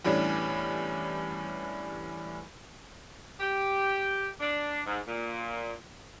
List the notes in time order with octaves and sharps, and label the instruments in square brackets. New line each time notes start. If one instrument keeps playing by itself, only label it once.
[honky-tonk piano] E2 A2 G3 C#4 D4
[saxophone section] G4
D4
G#2
A#2